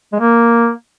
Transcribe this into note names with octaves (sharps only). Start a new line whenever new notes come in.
G#3
A#3